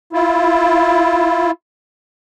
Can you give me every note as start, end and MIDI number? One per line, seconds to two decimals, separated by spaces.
0.13 1.51 64
0.13 1.51 65